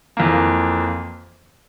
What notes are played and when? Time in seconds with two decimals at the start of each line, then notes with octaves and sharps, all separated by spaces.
0.17 F2 E3 A#3